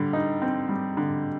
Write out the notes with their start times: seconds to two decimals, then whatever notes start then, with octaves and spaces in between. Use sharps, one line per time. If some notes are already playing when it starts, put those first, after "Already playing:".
Already playing: D3 G3
0.13 D#4
0.42 C4
0.69 G3
0.97 D3